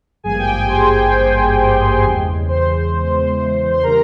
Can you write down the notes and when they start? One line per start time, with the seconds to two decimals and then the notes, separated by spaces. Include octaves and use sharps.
0.23 G#1 G2 F3 A#3 G#4 G#5
0.39 G4 G5
0.53 G#4 G#5
0.69 C5 C6
2.03 E2 C#3 E3 G#3
2.49 C5 C6
3.73 C6
3.83 E3 G3 C4 A#4 A#5